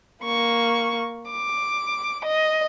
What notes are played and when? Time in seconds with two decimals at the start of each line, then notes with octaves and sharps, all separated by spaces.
0.24 A#3 C#6
1.30 D6
2.25 D#5